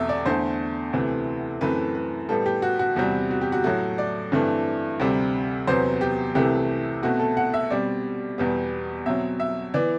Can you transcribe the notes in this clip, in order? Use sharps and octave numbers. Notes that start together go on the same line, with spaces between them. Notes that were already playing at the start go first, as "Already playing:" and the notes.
Already playing: E2 B2 A3 C4 E5
D5
E2 D3 A3 C5
D2 C3 E3 A3
F#2 E3 A3 C4 B4
B4
A2 G3 B3 A4
G4
F#4
F#4
E2 C3 G3 C4 F#4
F#4
G4
F#4
A2 F#3 A3 F#4
D5
G2 E3 A3 C4
D2 C3 G3 C4
E2 C3 F#3 B3 C5
G4
C2 C3 E3 A3 G4
B2 A3 C4 F#4
A4
F#5
E5
B2 G3 C4 D5
E2 B2 G3 B3
B2 F#3 C4 E5
E5
E3 B3 D5